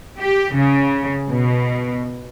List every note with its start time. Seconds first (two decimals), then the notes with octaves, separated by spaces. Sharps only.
0.20 G4
0.56 C#3
1.30 B2